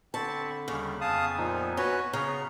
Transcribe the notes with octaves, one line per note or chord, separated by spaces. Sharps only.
D3 C4 A5 B5 C#6
D#2 C#3 G3
F2 B3 F5 G#5 A5 D#6
A#2 F3 D#4
C#4 F#4 B4 C#5
C#3 B3 A#5